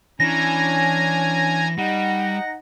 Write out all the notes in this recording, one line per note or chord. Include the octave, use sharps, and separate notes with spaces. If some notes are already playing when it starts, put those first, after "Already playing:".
E3 C#4 D4 G#5 A#5 A#6
G3 D#4 F#5